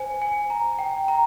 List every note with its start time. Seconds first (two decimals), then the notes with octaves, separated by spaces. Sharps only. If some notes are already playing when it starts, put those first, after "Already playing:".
Already playing: C5 G#5
0.22 G#5
0.50 A#5
0.79 G5
1.08 A#5